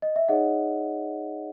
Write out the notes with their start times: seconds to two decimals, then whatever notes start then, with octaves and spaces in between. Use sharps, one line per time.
0.02 D#5
0.16 E5
0.28 D#4 G#4 C#5 D#5 F#5